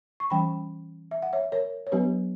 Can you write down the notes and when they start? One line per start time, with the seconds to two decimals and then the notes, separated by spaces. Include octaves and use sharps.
0.20 C#6
0.30 E3 G3 C#4 G5 B5
1.11 E5
1.22 F#5
1.33 C#5 E5
1.52 A#4 C#5
1.87 C#5
1.92 F#3 B3 D4 G4 B4